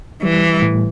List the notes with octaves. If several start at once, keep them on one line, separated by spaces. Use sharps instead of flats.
E3 G3
A2